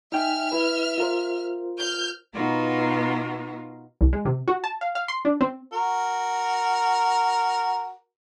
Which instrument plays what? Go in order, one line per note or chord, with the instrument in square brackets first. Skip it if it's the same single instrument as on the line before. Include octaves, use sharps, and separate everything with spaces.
[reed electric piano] D#4 G5 G#5 [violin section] E5 F6
[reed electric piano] E4 B4
F4 A#4 C5
[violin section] F6 G6
[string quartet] B2 B3 D#4 F4 F#4 A#4
[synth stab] C2
G#3
C3
F#4
A5
F5
F5
C6
D4
C4
[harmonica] F#4 A#4